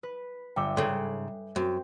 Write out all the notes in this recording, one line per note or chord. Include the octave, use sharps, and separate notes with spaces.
B4
G1 E5 G5 D6
G#2 C#3 A4 C#5 F#6 C7
F#2 C4